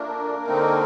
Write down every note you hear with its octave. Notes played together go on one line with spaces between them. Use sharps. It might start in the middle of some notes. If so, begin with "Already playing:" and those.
Already playing: A#2 A3 A#3 D4 A#4
D3 A3 C4 D#4